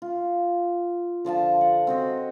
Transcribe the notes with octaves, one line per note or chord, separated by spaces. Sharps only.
F4
D3 F3 F4 A5
F#5
C4 F#4 D#5